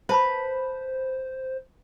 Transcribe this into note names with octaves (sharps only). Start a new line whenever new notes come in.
B4 C5 E5 A5 B5